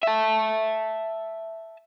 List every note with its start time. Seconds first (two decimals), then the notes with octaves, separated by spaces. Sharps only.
0.03 E5 A5